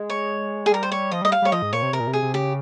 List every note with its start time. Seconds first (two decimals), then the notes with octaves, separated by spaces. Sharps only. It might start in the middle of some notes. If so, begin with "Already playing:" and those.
Already playing: G#3
0.10 C#5
0.66 G#4
0.71 G3 A#4
0.83 C5
0.92 C#5
1.11 F3 D#5
1.22 G3 D#5
1.32 F5
1.42 G3 C#5
1.52 F3 D#5
1.62 G#2
1.73 A#2 C#5
1.82 C3
1.93 C3 A#4
2.00 A#2
2.07 C3
2.13 G#4
2.22 C3
2.34 C#3 G4